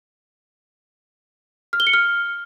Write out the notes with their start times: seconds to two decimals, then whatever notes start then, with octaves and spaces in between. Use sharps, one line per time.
1.73 F6
1.80 G7
1.87 C#7
1.93 F6